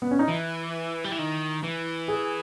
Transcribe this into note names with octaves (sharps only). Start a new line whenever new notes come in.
B3
C#4
D#4
E3 E4
G3
E3
D#3
E3
G#4